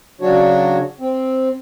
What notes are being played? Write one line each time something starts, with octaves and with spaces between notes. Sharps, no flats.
C#3 F#3 D4 F#4 C#5
C4